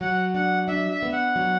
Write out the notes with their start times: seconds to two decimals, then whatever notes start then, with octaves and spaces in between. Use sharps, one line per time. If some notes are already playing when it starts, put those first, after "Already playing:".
0.01 F#3 F#5
0.34 D4 F#5
0.68 D4 E5
0.91 E5
1.03 B3
1.13 F#5
1.36 F#3